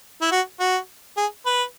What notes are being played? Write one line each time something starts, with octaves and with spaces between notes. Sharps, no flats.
E4
F#4
F#4
G#4
B4